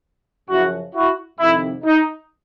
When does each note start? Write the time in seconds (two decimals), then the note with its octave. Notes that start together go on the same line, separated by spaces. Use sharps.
0.49 F#2 C#3 F3 E4 F#4
0.95 E4 F#4
1.39 F2 C3 D#3 E4
1.85 D#4